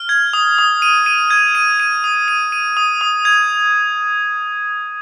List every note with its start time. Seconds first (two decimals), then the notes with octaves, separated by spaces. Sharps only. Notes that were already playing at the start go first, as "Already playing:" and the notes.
Already playing: F6
0.09 G#6
0.33 D#6
0.59 D#6
0.82 D#7
1.06 D#7
1.30 G#6
1.55 D#7
1.80 D#7
2.04 D#6
2.28 D#7
2.52 D#7
2.77 D#6
3.01 D#6
3.25 G#6